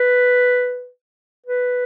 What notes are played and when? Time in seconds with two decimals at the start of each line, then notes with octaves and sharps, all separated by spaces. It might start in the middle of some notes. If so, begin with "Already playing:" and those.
Already playing: B4
1.46 B4